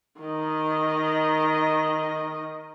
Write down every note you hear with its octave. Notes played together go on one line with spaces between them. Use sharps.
D#3 D#5